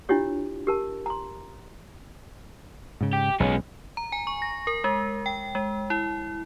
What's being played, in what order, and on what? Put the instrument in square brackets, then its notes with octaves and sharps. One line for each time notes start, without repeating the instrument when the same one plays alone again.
[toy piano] D4 E4 F4 G4 C#5
G4 A#4 A5
A#5 C6
[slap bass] G#2 C#3
[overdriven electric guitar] G4
[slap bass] B1 [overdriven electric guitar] G#3 C#4
[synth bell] A#5
G#5
C#6
A#6
A#4
G#3
G5
G#3
E4